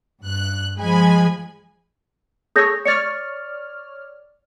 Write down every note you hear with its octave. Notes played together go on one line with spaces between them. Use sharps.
G2 F#6
F3 G#3 G#5 B5
G#4 A4 C#5 D#6 G6 A#6
C#5 D5 F6 A6 C#7